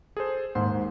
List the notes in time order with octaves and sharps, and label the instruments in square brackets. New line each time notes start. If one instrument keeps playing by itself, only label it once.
[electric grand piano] G#4 A4 C5
[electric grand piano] D#2 C5 C6 [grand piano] G#2